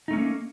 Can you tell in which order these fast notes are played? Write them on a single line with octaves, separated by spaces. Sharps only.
D#4 A3 C#4 G3 A#3